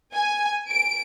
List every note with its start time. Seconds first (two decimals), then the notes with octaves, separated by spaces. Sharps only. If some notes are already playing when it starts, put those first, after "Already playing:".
0.13 G#5
0.68 D7